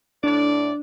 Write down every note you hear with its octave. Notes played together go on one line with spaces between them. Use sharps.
A2 D4 D5